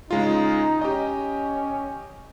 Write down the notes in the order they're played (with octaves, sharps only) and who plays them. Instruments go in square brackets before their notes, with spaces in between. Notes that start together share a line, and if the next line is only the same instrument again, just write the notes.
[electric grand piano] C#3 G#3 F4 [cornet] D#4
[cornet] C#4 [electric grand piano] G4 D#5